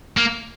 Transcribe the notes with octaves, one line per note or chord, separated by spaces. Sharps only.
A#3